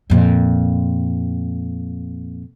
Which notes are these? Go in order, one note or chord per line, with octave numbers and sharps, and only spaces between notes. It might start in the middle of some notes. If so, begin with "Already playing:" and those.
F2 A#2